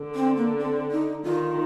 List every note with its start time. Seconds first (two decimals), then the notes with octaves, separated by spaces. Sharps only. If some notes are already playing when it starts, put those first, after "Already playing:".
Already playing: D3
0.15 C4
0.36 A#3
0.58 C4
0.91 D#4
1.24 D#3 F4